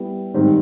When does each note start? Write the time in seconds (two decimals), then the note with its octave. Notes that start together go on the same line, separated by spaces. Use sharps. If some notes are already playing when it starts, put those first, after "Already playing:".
Already playing: G3 B3 E4
0.34 G#2 D#3 G3 C4